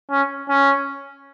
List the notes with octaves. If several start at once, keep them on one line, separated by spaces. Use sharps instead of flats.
C#4
C#4